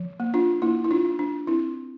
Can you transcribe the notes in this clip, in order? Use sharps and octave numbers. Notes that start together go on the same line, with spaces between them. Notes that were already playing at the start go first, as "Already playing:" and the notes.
Already playing: F3
A#3
D4 F4
A#3 E4
E4
D4 F4
D4
D4
C4 E4